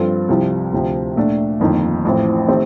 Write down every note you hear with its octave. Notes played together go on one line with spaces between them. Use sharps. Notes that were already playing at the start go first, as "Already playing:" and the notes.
Already playing: G2 F3 C4 F4 A4
C2 C3 F3
D2 C3 F3
A#2 A3 D4
G1 F2 D#3 A#3 D#4
A1 A2 F3 C4
D#3 A3 C4 G4 C5